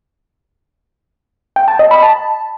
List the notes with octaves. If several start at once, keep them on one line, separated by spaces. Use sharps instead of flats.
G5
A5
D#5
B5
A5